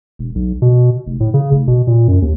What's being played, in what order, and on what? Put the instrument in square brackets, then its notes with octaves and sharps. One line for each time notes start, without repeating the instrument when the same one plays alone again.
[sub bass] E1
B1
B2
F1
A2
C#3
F1
B2
A#2
F#2
D#2